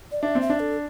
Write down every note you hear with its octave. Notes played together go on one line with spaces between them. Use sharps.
D5
D4 E5
C4
E5
D4
A4